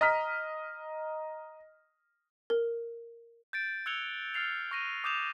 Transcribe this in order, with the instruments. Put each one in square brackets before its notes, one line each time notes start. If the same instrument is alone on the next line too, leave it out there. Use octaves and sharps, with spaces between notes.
[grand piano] D#5 A#5 F6 B6
[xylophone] A#4
[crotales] G6 A6 D7
E6 F#6 G#6 C#7 F7 G7
F6 A6 C7 F7
C#6 A#6 D#7
D6 D#6 G6 E7 F7